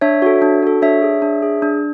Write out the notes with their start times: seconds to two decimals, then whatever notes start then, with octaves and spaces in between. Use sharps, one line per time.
0.01 D4 C#5 E5
0.22 F#4 A4
0.42 D4
0.63 F#4 A4
0.82 D4 C#5 E5
1.02 G#4
1.22 D4
1.42 G#4
1.62 D4